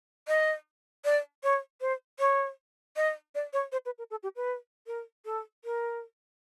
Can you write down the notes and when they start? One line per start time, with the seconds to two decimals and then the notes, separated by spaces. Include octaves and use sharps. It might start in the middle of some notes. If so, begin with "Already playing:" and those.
0.28 D#5
1.05 D5
1.43 C#5
1.81 C5
2.19 C#5
2.96 D#5
3.35 D5
3.53 C#5
3.72 C5
3.85 B4
3.98 A#4
4.11 A4
4.23 G4
4.36 B4
4.87 A#4
5.25 A4
5.64 A#4